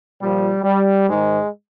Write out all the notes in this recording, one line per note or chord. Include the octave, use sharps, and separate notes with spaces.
A#2 F3 G3
G3
G#2 D#3 G#3